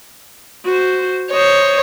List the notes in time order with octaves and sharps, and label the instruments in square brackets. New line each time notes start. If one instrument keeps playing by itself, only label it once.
[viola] F#4 C5
[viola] C5 D#5 [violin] C#5